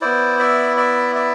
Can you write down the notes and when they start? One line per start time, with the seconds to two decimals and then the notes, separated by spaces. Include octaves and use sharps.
0.01 B3 E4 C5 D5
0.39 D5 E5
0.77 D5 E5
1.15 D5 E5